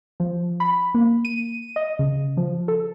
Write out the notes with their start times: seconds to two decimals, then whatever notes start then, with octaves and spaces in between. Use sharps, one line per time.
0.20 F3
0.60 B5
0.94 A#3
1.25 D#7
1.76 D#5
1.99 C#3
2.37 F3
2.68 A4